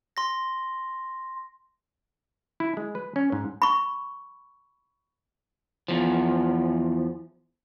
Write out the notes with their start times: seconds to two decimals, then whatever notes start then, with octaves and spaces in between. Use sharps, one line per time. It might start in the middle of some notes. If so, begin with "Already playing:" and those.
0.17 C6 A#6
2.60 E4
2.77 G#3
2.95 B4
3.16 C#4
3.32 G#2
3.62 B5 C#6
5.88 E2 F3